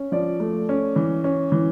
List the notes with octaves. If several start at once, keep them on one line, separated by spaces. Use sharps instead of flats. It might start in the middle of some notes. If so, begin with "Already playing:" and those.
Already playing: C#4
F3 D5
A3
C#4
E3
C#4
E3